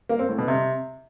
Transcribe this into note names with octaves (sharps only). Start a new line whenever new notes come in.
A#3
C4
A2
B2
C3